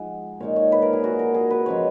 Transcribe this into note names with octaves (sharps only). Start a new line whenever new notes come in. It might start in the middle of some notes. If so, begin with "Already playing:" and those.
Already playing: F3 G#3 D#4 F#5 G#5 A#5
A#2 G#3 D#4 C#5
C#5
B4
A#4
G#4
F#4
A#4
G#4
B4
C#3 F3 G#3 C#5